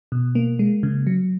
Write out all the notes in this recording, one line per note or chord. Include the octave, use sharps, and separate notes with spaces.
B2
A#3
G#3
C#3
F#3